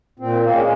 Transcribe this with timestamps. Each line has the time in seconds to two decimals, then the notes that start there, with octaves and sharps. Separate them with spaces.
0.19 A#2 C4
0.41 A#3
0.51 G#3 C#4